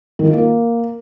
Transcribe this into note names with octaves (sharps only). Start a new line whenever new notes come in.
D#3
F4
A#3